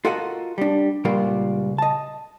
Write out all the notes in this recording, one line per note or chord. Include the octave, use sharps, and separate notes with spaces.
F4 F#4 A4 A#4 D#5 F#5
G3 D4
C#2 A#2 G3 F4 F#4 A#4
D#5 A5